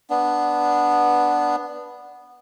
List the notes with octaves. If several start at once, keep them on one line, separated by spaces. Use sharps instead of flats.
B3 D4